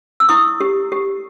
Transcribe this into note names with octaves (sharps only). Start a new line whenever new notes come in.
E6
E4 C#6 D#6
G4
G4